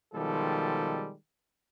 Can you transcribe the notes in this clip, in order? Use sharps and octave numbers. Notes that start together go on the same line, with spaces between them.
B2 D#3 F3 G3 G#3 A4